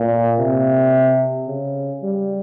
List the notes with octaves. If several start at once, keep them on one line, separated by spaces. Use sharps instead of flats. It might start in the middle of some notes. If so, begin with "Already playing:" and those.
Already playing: A#2
C3
C#3
G3